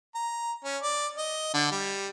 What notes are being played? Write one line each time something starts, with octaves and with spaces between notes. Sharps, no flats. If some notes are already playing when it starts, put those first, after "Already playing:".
A#5
C#4
D5
D#5
D3
G3